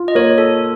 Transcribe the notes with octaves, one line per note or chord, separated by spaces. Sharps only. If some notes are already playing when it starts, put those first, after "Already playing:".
Already playing: F4
D#5
A#3 C#5
A4